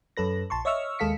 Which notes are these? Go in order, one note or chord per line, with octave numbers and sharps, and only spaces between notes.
F#2 A4 B4 A#6
A#1 A5 C6 C#6
C#5 D#5 E5 C#6 E6 F6
D#2 G#3 A4 F5 B6 C#7